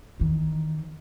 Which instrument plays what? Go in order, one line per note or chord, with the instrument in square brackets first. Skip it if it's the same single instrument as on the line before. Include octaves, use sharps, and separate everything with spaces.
[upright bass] E2 D#3